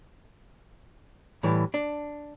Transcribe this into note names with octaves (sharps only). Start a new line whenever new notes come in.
A2 E3 G3
D4